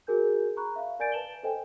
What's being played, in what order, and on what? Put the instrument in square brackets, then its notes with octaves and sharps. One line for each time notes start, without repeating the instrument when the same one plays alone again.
[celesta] F#4 G#4 A#4 G#5 G6
A#5 B5 C#6 F#6
E5 F5
A#4 D5 G#5 G6 A6 D7
B4 A5 E7 F#7 G7
A4 C5 D#5 G5 G#5